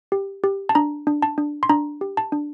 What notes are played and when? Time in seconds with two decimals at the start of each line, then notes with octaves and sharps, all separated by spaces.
0.12 G4
0.44 G4
0.69 A5
0.75 D4 A#5
1.07 D4
1.22 A5
1.38 D4
1.63 C6
1.69 D4 A#5
2.01 G4
2.17 A5
2.32 D4